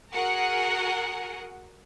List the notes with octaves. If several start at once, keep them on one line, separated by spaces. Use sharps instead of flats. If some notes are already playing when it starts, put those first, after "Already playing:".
F#4 G#4 A#4 F#5